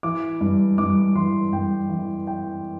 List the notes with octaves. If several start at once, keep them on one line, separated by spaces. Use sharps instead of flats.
E3 D6
G2
G2 D6
E3 C6
G2 G5
E3
E3 G5